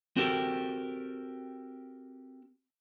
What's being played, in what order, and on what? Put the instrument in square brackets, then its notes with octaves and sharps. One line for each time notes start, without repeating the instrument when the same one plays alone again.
[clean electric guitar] C4 F#4 G4 A4 A#4